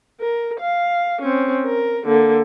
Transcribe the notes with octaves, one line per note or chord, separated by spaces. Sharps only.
A#4
F5
C4 C#4
A#4
D3 A#3